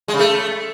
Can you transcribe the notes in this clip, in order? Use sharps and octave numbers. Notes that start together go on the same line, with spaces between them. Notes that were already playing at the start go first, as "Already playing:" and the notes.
G#3
C#3
A3